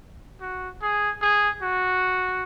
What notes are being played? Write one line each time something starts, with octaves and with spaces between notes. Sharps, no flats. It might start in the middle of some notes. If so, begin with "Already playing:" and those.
F#4
G#4
G#4
F#4